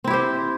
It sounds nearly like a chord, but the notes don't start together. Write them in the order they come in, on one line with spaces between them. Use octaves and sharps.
C4 E4 G4 C5